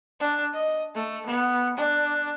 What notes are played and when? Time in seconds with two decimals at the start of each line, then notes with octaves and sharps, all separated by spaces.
0.20 D4
0.53 D#5
0.95 A3
1.26 B3
1.77 D4